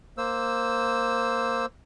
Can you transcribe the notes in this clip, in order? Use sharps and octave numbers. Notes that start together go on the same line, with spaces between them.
A#3 C5 E6